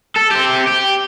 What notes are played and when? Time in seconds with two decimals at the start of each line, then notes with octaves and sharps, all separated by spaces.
0.16 A4
0.31 C4 G4
0.67 G4